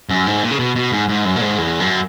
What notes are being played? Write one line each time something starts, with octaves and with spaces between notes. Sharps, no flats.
F#2
G#2
A#2
C#3
B2
B2
G#2
G#2
F#2
A#2
G#2
E2
F#2